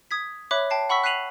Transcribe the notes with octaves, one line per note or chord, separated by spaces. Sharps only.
D#6 G#6 B6
C#5 E5 B5 D6 F#6
G5 A5 C7
F#5 B5 C#6 E6 B6
F#6 B6 C7 D#7 F7 F#7